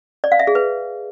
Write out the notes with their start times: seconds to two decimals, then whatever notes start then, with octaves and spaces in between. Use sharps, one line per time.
0.24 D5
0.32 F5
0.39 E5
0.47 G#4
0.55 B4